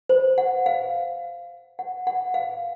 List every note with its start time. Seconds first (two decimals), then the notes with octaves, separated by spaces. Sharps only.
0.09 C5
0.38 F#5
0.66 F5
1.79 F#5
2.07 F#5
2.34 F5